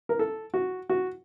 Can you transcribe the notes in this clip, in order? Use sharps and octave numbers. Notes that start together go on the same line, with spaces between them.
A#4
A4
F#4
F#4